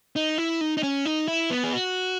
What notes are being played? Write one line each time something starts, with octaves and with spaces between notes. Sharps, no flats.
D#4
E4
D#4
D#4
C#4
D#4
E4
B3
G#4
F#4